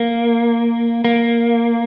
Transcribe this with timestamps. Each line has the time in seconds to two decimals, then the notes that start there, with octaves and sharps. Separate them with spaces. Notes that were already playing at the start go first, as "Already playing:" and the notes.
Already playing: A#3
1.05 A#3